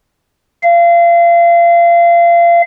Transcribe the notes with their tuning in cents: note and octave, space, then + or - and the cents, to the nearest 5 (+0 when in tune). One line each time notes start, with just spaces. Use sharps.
F5 -30